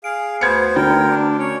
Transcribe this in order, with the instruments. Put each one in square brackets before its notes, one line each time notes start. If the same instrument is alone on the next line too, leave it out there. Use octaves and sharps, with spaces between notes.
[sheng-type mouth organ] G#4 F5 [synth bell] D7
[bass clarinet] D2 [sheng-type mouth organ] B3 C5 [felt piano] G#6 C#7
[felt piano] D3 [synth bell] A3 F#4 [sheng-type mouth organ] A#4 G5
[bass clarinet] D4
[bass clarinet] C#4 [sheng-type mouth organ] C#5